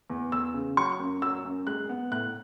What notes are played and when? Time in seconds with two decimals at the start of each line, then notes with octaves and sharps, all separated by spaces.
0.10 E2
0.32 E2 E6
0.54 C#3
0.77 F#3 C#6
1.00 F#2
1.22 F#3 E6
1.45 F#2
1.67 G#3 F#6
1.89 B3
2.11 A2 F#6